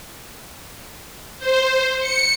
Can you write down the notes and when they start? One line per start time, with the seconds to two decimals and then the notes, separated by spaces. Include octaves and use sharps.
1.39 C5
2.00 C#7